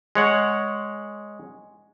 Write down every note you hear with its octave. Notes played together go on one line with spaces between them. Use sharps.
G#3 C#5 F#5